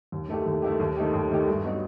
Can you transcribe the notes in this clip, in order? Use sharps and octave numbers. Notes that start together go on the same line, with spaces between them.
D#2
D#3 A3 E4 G4
D#2
D#3 A3 E4 G4
D#2
D#3 A3 D#4 G4
D#2
D#3 A3 D#4 G4
G2
F#3 B3 D#4 F#4